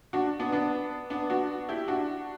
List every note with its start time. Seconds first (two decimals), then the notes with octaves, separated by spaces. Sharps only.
0.13 D4 F#4
0.40 B3 D4
0.52 B3 D4
1.10 B3 D4
1.30 D4 F#4
1.69 E4 G4
1.88 D4 F#4